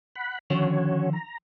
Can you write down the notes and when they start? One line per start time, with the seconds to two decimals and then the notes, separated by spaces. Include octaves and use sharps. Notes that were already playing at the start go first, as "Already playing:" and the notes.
0.16 F#5 B5
0.50 D3 D#3 F3 C#4 F#4 C#5
1.13 A#5